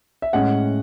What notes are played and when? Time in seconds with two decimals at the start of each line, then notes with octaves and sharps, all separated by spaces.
0.22 E5
0.33 A2 G#3 C#4 F#5